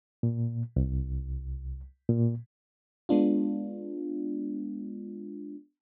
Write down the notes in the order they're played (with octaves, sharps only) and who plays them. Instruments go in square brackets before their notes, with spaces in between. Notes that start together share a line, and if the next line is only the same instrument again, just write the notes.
[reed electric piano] A#2
C2
A#2
[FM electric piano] G#3 B3 D4 F4